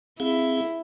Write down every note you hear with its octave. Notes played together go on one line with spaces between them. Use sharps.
C4 E4 G#4 F5